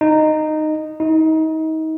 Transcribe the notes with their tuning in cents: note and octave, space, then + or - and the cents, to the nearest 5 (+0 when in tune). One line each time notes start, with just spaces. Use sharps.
D#4 -10
D#4 +30